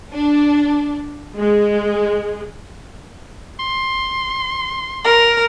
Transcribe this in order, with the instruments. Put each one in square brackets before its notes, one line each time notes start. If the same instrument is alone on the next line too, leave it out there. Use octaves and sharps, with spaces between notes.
[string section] D4
G#3
[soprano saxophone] C6
[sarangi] A#4